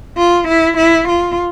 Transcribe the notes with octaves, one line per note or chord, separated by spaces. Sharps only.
F4
E4
E4
F4